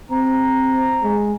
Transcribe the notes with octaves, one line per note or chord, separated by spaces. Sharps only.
C4 A#5
G#3